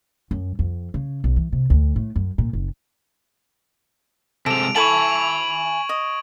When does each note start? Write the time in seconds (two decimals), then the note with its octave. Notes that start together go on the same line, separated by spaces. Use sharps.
0.31 F#2
0.59 F2
0.94 C#3
1.24 B1
1.36 E3
1.52 C3
1.70 D2
1.96 A2
2.16 F#2
2.38 A#2
2.53 F#1
4.46 C3 G#3 A4 D7 F7
4.76 E4 A4 G#5 A5 B5 C#6 G#6 F#7
5.89 D#5